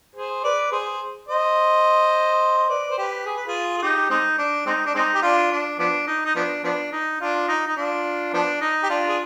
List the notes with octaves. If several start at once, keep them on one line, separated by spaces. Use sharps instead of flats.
G#4 C5
B4 D5
G#4 C5
C5 D#5
D#5
B4 D5
C5
G4 B4
G#4
B4
F4 G#4
G#4
D#4 G4
G#3 C4 D#4
D4
G#3 C4 D#4
D4
G#3 C4 D#4
G4
D4 F4
D4
F3 B3 D4
D#4
D#4
F3 B3 D4
F3 B3 D4
D#4
D4 F4
D#4
D#4
D4 F4
F3 B3 D4
D#4
G4
D4 F4
G#4